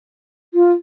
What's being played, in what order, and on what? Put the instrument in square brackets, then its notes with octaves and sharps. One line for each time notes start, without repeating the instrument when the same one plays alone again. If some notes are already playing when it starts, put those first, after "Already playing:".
[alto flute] F4